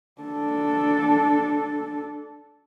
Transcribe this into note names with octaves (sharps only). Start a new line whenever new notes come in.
D4 A4